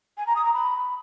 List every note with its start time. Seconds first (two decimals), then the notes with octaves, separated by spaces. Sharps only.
0.18 G#5
0.27 A#5
0.36 D#6
0.45 A#5
0.54 B5